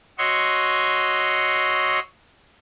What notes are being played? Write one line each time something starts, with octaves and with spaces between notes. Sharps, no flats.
F#4 C#5 D#5 C6 C#6 E6